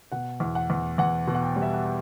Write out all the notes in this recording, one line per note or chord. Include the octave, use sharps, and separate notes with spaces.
B2 F#5
E2
F#5
E2
E2 F#5
B2
F#5
G5
G3
E5
F#5
G5